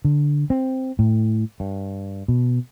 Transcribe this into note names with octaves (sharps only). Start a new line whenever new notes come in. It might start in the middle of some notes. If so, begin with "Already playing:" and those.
D3
C4
A2
G2
B2